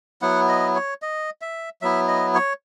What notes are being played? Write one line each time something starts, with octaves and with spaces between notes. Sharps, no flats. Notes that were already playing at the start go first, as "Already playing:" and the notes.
F#3 B3 E4 F#5
D#5
C#5
D#5
E5
F#3 B3 E4 E5
D#5
C#5